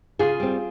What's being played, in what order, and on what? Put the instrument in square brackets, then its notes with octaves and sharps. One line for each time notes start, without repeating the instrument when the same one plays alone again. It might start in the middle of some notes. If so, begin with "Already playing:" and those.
[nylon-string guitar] C#3 F4 G#4
G3 C4